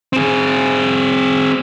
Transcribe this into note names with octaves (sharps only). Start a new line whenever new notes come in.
C4 G#4